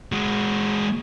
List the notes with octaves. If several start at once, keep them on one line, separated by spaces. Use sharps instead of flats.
G#3 F#4